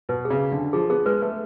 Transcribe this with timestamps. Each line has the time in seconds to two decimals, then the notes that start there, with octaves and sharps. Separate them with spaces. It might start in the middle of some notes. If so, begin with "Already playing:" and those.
0.09 B2 B4
0.25 G#4
0.30 C#3
0.41 G#4
0.52 D3
0.57 D4
0.73 F3 G#4
0.90 B3 G#4
1.06 G#3 B4
1.22 A3 B4